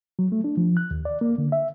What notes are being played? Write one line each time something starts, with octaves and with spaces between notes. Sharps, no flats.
F#3
A3
D4
F3
F#6
D#2
D5
A#3
D3
E5